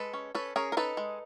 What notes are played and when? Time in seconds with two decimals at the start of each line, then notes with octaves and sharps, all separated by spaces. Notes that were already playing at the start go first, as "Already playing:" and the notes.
Already playing: G#3 A4 B4
0.13 C#4
0.35 C#4 A4 B4
0.56 C#4 G#4 A#4
0.72 A#4
0.77 D#4 A4 B4
0.97 G#3